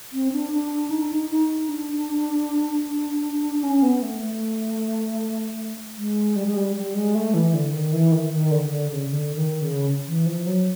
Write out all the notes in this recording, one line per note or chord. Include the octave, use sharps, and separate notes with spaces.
C4
D4
D4
D#4
D4
D#4
D#4
D4
C#4
B3
A3
A3
G#3
G3
G#3
G3
G3
G#3
A3
E3
D3
D#3
E3
D#3
D#3
D3
D3
C#3
D3
D#3
C#3
E3
F3
F#3